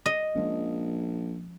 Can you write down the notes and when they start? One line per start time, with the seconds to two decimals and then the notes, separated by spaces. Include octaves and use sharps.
0.06 D#5
0.36 A#1 F3 G#3 C#4